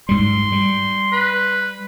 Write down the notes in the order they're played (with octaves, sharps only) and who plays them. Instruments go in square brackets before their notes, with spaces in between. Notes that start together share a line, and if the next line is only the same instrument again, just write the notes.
[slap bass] G#2 G3 [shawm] C6
[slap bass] G3
[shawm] B4